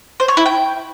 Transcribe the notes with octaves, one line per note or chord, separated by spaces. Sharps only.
C5
C#5
E4
G5